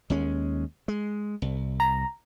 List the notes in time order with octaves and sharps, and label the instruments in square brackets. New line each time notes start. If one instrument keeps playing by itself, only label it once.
[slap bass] D#2 G#3 C#4
G#3
C2
[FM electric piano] A#5